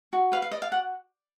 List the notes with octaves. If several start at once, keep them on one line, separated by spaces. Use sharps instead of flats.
F#4
B4 F5
F5
D5 D#5
F5
F#4 F#5